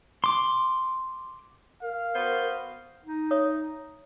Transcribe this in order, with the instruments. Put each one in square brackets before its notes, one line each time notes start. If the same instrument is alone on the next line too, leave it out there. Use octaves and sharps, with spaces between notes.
[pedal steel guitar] C6 D6
[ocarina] A#4 [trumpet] F5
[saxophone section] B3 F#4 C5
[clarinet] D#4
[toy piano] C#5 E5 D#6